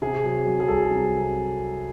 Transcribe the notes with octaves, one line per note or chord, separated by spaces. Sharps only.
C3 G#4
F#3
F#3
G#4
C2 A4
C3